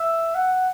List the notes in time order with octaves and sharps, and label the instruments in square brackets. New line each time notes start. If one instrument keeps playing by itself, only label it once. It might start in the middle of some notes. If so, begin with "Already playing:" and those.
Already playing: [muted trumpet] E5
F#5